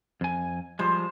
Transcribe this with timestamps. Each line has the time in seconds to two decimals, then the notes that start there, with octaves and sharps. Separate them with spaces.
0.21 F2 G#5
0.79 F3 G3 G#3 C5